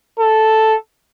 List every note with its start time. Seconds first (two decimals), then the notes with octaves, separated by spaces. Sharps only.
0.19 A4